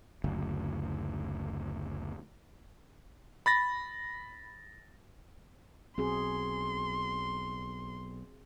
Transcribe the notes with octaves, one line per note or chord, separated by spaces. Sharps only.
F#1 D2
B5 A6 A#6
B1 C4 F#4 G#4 C6